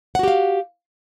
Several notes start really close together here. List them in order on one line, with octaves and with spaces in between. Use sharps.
F#5 F#4 G4 F5